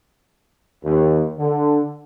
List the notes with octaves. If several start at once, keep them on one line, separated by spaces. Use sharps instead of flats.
D#2
D3